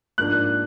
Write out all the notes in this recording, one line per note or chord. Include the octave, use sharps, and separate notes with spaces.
G#2 F3 A#3 D4 F#6